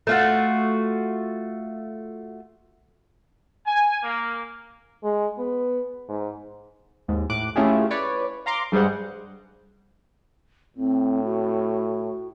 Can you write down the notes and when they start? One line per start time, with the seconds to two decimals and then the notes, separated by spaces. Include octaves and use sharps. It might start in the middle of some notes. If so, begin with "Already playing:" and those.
0.07 A3 F4 F#4
3.65 G#5
4.02 A#3
5.04 G#3
5.38 B3
6.09 G#2
7.08 D#2 G#2
7.30 A2 D6 F#6
7.56 A3 C#4 E4 F4 G4 G#4
7.91 B4 C#5 D5
8.46 F5 A#5 C6 D6
8.72 G2 G3 G#3 G#4 C5 F#5
10.77 A2 C4
11.24 F#4